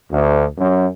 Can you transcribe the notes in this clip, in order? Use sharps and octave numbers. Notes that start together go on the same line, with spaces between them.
D2
F#2